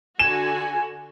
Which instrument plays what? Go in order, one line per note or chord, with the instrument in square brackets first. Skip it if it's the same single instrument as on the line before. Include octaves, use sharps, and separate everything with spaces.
[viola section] D3 F#4 [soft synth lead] G#5 [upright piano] E7